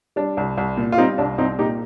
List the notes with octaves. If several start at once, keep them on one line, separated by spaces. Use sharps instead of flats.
G3 D4
C2
C2
A#2
F4
G3 C4 D#4
C2 D4
C2 C4 D#4
A#2 D#4 G4